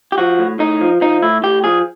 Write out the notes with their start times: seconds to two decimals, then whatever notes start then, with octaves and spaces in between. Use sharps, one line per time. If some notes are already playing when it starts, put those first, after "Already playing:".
0.12 G4
0.18 F3 F#4
0.39 A2
0.59 A2 D#4
0.81 F3
1.01 F3 D#4
1.23 A2 E4
1.43 A2 G4
1.64 F3 G#4